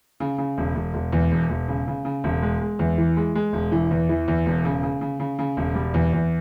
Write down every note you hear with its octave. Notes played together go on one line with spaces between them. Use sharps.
C#3
C#3
E1
E1
E1
E2
E1
E1
C#3
C#3
C#3
E1
G#3
G#3
E2
E3
G#3
G#3
E1
E3
E2
E3
E2
E1
C#3
C#3
C#3
C#3
C#3
E1
G3
E2
E2